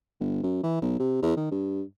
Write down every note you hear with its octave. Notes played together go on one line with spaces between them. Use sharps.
G1
F#2
E3
B1
C3
E2
D#3
G2